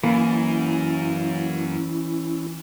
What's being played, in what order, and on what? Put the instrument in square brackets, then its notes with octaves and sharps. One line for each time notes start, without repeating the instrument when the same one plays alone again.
[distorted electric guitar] F#2 [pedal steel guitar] E3 [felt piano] A#3 [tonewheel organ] C#4 E4